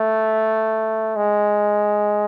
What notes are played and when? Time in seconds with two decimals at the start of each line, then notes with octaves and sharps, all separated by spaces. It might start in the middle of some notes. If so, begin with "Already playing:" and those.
Already playing: A3
1.16 G#3